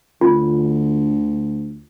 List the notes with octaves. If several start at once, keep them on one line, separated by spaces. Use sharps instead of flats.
D2 D3 F4